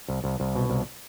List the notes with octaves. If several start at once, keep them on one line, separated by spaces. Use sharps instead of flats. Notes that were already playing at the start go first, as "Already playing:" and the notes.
C2
C2
C2
B2
C2